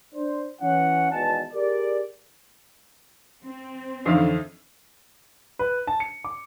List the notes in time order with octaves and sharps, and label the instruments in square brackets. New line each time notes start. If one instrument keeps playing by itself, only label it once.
[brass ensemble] D4 C5
E3 C#4 F#5
G#1 E2 B2 G#5 A5
G4 G#4 A#4 D5
[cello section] C4
[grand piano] F2 E5 F5 [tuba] D3 [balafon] E3 F3 D#4
[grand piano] B4
A5
C#7
D6